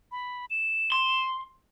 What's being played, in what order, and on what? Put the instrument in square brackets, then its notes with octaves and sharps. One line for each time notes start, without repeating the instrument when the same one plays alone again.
[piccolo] B5
E7
[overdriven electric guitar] C6